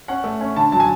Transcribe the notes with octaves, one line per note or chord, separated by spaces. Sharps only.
C#4 F#5
A3
C#4
D3 A5
F#3 A5
G#5